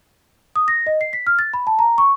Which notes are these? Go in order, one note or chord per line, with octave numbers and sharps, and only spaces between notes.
D#6
A#6
D#5
C7
B6
F6
A6
B5
A5
A#5
C#6